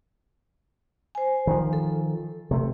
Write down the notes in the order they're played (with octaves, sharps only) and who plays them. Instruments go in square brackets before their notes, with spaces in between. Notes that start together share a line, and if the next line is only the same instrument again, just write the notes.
[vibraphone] C5 G#5
[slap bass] D#3 F3
[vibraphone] A4
[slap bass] C3 A3